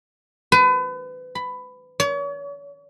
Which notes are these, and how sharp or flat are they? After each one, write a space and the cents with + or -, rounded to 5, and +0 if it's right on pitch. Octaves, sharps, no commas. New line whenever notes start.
B4 +35
B5 +15
C#5 +40